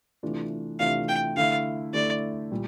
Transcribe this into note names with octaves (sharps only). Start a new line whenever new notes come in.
C3 E3 A3 D4 F4
C3 E3 A3 D4 F4 F5
G5
D3 A3 E4 F5
D3 A3 E4 D5
A#2 G3